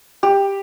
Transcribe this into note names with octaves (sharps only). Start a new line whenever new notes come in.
G4